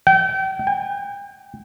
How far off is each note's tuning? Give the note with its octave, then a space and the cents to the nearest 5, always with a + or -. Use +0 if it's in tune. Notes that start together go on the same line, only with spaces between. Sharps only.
G5 -35
G5 +45